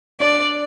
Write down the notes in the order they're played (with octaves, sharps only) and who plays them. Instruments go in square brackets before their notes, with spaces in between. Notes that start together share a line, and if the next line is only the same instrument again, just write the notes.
[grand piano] D4 [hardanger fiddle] D5